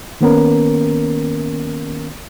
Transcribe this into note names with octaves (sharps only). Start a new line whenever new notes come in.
D#3 A#3 B3 C#4 A#4